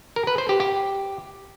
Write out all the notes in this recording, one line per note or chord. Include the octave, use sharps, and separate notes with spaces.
A#4
B4
C5
G4
G4